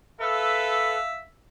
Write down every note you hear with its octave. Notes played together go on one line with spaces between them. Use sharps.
A4 B4 E5 F5